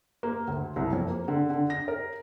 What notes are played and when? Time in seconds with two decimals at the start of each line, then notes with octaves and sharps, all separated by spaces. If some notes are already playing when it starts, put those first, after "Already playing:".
0.23 A#3
0.48 D2
0.76 C2
0.93 F2
1.08 A#3
1.28 D3
1.50 D3
1.70 A#6
1.88 A#4